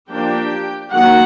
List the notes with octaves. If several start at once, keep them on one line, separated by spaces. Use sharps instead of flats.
F3 A#3 D4 G4 G5
D#3 F#3 A#3 F#4 F#5